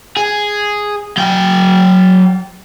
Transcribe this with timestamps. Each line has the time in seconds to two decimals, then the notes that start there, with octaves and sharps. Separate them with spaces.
0.17 G#4
1.17 F#3 G5